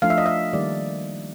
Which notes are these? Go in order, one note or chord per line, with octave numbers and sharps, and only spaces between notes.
F3 A3 D4 F5
E5
D#5
E5
D#3 G3 A#3 D5